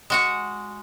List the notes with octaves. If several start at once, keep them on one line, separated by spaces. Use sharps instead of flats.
G#3 F#4 F#5